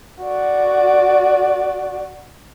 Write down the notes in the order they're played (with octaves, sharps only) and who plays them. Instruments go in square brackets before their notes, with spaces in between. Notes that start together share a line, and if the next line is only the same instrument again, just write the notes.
[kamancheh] F#4 D5